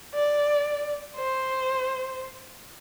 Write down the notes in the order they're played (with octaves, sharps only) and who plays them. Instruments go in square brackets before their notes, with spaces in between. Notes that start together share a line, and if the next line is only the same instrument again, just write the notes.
[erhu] D5
C5